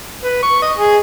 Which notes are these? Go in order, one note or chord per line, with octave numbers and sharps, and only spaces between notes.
B4
C#6
D#5
G#4